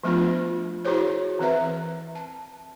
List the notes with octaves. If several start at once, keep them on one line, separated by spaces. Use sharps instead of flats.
F3 A3 B3 D4 F4
E4 F#4 G#4 C5 C#5
E3 C4 B4 E5
A5